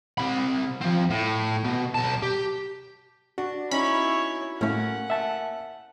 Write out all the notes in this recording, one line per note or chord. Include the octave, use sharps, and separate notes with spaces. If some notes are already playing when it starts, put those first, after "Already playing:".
C3 B5
F3 C4
A2
B2
B1 A5
G4
D4 F#4
C#4 D#4 E4 C#5 B5
A2 A3 A#3 C#4 F#5
E5 A5